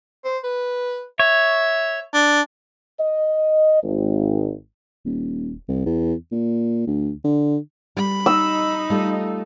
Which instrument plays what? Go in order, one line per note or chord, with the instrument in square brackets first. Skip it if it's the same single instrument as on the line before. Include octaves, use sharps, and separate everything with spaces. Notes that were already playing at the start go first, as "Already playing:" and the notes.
[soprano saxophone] C5
B4
[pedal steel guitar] C#5 [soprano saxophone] E5
[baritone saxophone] D4
[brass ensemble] D#5
G#1
[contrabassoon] D#1
C2
E2
A#2
D2
D3
[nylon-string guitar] G3 [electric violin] B5
[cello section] D#4 [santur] E6
[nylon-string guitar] G3 A3 F4